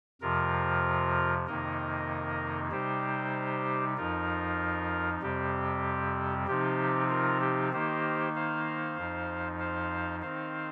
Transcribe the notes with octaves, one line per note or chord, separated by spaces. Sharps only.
F2 C3 F3 F4 A#4
F2 C3 D#3 A#3 D#4 A#4 D#5
C3 G3 D#4 G4 C5
F2 F3 D#4 F4 A#4
F2 C3 G3 C4 G4
C3 F3 C4 D#4 G4
F4 A#4
G4
D#3 A#3 D#4 G4 C5
C5 F5
F2 F3 D#4
C5 F5
D#3 C4 D#4 C5 F5